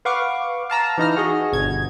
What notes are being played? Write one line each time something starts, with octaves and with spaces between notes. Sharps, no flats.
B4 F5 F#5 C#6 D6
F5 A5 A#5 E6
E3 D#4 A#5 F6
F#4 G#4 D#5
G1 B2 G#6